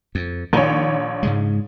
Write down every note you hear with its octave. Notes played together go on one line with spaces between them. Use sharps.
F2
A#1 D#3 C#5
G#2 C#3 G#3